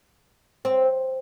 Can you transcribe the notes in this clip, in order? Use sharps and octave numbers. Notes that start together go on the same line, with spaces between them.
C4